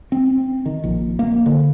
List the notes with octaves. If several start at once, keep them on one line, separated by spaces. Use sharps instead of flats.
C4
D#3
A#1
A#3
D3